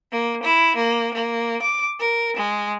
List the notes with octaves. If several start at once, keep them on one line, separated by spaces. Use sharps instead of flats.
A#3
E4
A#3
A#3
D6
A#4
G#3